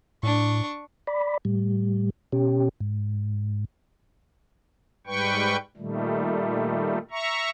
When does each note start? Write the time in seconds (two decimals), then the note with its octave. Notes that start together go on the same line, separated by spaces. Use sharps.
0.23 A2 D4 C#6
1.07 D5 B5
1.45 A2 G3
2.32 B2 C#4 G4
2.80 G#2
5.07 G#2 G3 B4 G5 C#6
5.77 A#2 D#3 G3 A3
7.11 E5 A#5 C#6